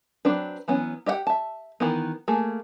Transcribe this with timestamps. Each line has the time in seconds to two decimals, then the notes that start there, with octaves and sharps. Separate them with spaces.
0.25 F#3 C4 D4 B4
0.68 E3 F#3 B3 C#4
1.06 G4 D#5 E5 F#5 G5
1.27 E5 A5
1.80 D#3 E3 B3
2.28 A3 A#3 G#4